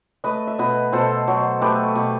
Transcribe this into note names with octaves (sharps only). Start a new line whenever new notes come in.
A3 B4 D#5
E5
B2 B4 D#5
B2 A4 C5
F#3
A3 G4 B4
B2